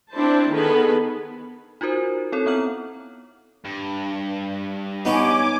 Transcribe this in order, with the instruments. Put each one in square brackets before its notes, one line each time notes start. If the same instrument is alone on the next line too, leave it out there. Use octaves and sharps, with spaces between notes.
[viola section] C4 D4 E4 C5 A5
D#3 B3 G#4 A4 B5
[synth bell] D#4 F4 F#4 A#4 C5
C4 E4 A4 C#5
B3 C4 F#5 A#5 F6 F#7
[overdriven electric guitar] G2
[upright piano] G3 D#4 [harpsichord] B3 C#4 [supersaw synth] G#5 D6